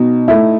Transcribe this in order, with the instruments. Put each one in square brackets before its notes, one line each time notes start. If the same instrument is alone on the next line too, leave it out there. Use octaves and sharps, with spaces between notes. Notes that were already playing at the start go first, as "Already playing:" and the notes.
Already playing: [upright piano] B2 [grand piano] D#4
[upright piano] A3 E4